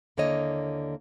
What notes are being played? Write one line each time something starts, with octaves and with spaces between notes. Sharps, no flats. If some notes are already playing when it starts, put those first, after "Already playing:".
D#2 D3 A#3 E4 C#5 D#5